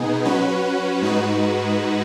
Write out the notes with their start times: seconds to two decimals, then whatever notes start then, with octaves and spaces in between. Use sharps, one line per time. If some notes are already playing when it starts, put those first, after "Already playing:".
Already playing: B2 B3 D#4 G#4
0.25 F#3 C#4 F#4 B4
1.02 G#2 G#3 D#4 F#4 B4